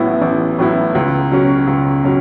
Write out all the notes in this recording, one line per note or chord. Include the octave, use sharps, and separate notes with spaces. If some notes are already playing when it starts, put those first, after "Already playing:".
Already playing: A1 A2 F#3 B3 E4
A1
A2 F#3 B3 E4
C#2
B2 F#3 C#4
C#2
B2 F#3 C#4